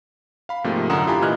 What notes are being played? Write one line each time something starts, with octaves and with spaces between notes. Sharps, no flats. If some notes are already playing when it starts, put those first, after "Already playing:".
F5 B5
G#2 C3 F3 A3 A#3
F#2 D3 F#5 A#5 D#6 E7
E4 F4 G4 G#5 A#5 B5
A#2 E3 D#5 F6 F#6 G#6